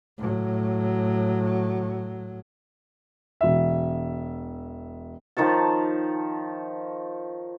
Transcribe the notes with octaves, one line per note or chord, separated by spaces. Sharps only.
A2 F#3
E1 E5
D#3 F3 C#5 A5